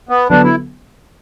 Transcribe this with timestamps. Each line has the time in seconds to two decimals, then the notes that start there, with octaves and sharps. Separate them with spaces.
0.09 B3
0.30 D3 F#3 B3 D4
0.43 E4